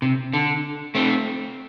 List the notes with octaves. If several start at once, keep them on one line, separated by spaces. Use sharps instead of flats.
C3
D3
A3 C4